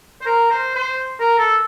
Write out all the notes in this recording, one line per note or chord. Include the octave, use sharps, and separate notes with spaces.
C5
A#4
C5
C5
A#4
A4